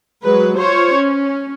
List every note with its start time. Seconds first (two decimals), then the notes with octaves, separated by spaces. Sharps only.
0.23 F#3 G#3 B4
0.57 F4 C5 C#5
0.96 C#4